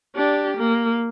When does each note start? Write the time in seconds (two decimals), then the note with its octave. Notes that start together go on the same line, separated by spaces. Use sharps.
0.15 D4 G4
0.57 A#3